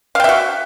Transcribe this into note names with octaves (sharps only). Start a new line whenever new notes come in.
F#4 E5 F5 G5